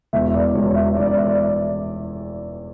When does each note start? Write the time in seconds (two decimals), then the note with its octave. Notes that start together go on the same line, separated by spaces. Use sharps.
0.13 E1 E2 E3 E5
0.34 D5
0.55 E1 E2 E3 C#5
0.75 E5
0.96 E1 E2 E3 D5
1.06 D5
1.17 E5
1.28 D5